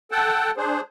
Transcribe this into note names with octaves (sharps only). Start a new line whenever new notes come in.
A4 F#5 G5 A5
D4 G#4 C5